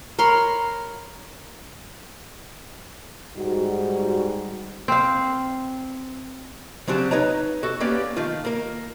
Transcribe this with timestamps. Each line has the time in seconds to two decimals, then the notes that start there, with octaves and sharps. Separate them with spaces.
0.19 A#4 C#5 B5 C6
3.37 G#2 G3 D#4 F#4
4.88 C4 F5
6.88 C#3 F#3 C4 D4 G4
7.11 D#4 B4 C#5 D#5 A#5
7.63 F#4 A4
7.80 A#3 B3 C#4 G4 D5 F5
8.17 D#3 A3 F4
8.45 A#3 A#4